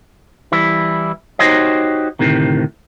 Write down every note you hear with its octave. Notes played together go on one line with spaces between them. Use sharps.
E3 G3 E4
D#4 F#4 G4 C5 C#5 D#5
D2 A2 C3 D#3